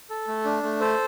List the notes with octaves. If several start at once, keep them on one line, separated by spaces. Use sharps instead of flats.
A4
A3
D4
A3
A4 C5